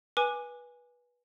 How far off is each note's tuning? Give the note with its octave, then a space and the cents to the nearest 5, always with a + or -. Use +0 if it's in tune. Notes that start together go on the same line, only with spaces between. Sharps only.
B4 -20 G#5 -5 D6 +20